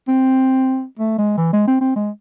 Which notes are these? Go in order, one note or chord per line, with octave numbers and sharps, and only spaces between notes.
C4
A3
G#3
E3
G#3
C4
C4
G#3